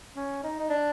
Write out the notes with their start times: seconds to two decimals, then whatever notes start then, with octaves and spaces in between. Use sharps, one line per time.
0.16 C#4
0.43 D#4
0.59 D#4
0.70 D4